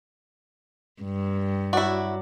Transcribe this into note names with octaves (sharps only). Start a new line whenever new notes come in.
G2
F#3 E4 F#4 D5